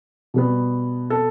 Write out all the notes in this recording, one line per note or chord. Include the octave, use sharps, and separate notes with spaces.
B2 G3 B3
A4